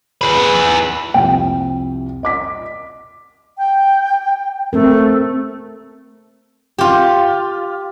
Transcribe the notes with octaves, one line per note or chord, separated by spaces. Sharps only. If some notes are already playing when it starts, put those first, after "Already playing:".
G#4 B4
C2 F2 G5
D#5 D6 B6
G5
A3 C4 A#4
F4 G4